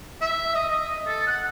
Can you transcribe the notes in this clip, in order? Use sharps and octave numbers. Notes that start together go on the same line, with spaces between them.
E5
D#5
D#5
A4
F#5